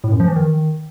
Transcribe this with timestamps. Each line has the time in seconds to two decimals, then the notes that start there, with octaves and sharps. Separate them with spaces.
0.04 A2
0.12 F#2
0.20 F3
0.28 E3
0.36 D#3